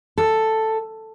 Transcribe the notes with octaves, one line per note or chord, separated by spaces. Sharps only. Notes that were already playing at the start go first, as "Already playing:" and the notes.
A4